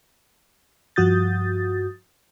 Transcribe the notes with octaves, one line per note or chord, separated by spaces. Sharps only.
G2 F3 F#4 D#6 G6 A6